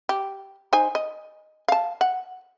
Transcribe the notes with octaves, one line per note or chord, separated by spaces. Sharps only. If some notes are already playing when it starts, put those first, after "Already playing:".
G4
D#4 C5 G#5
D#5
F5 A5
F#5